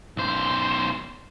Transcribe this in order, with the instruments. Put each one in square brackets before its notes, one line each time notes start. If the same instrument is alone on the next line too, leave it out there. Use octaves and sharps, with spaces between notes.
[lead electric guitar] B1 C5